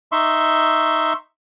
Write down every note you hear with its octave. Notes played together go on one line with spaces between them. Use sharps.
D#4 E5 C6 C#6